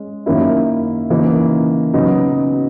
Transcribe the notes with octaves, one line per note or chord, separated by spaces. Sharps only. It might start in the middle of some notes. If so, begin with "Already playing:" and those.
Already playing: G#3 C#4
F#2 D#3 A#3 C#4 E4
C#3 E3 A#3 D#4
C#3 F#3 B3 D#4